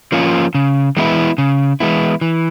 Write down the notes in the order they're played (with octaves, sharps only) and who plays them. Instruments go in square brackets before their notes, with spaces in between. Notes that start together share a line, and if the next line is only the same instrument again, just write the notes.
[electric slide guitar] F3 A#3 C#4 F4
C#3
E3 G#3 B3 E4
C#3
E3 G#3 B3 E4
E3